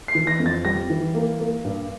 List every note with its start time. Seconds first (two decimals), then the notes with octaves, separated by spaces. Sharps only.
0.08 C7
0.15 E3
0.27 A#6
0.40 F2
0.46 A6
0.65 G3 A#6
0.90 E3
1.14 A#3
1.40 A#3
1.64 G2